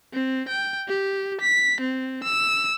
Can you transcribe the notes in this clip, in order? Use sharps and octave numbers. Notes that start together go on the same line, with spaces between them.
C4
G5
G4
B6
C4
E6